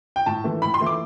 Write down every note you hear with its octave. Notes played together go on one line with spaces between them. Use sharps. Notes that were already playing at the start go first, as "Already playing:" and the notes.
G5
A2 A5
E3 A3
A2 B5
C6
E3 A3
D6